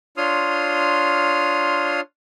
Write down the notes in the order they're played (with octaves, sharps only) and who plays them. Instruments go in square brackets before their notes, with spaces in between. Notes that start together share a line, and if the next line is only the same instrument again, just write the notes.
[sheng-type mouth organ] D4 F4 C#5 C6 D#6 F6